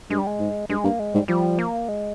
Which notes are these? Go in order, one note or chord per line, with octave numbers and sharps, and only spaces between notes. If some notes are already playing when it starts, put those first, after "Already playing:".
G2 G#3
G3
G#3
G#2
G2 G#3
G2 A#3
G#3
G#2 G3
F3 G3
A#3
G#3